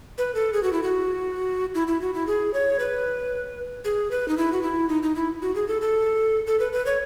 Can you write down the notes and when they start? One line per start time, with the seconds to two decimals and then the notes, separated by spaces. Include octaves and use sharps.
0.18 B4
0.35 A4
0.53 G#4
0.63 F#4
0.73 E4
0.83 F#4
1.75 E4
1.88 E4
2.01 F#4
2.14 E4
2.27 G#4
2.54 C#5
2.79 B4
3.85 G#4
4.11 B4
4.28 D#4
4.38 E4
4.52 F#4
4.63 E4
4.89 D#4
5.03 D#4
5.16 E4
5.42 F#4
5.55 G#4
5.68 A4
5.81 A4
6.47 A4
6.60 B4
6.73 B4
6.86 C#5